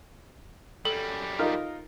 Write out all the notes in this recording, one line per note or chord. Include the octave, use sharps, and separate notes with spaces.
F#2 G3 A4
D#4 F4 A#4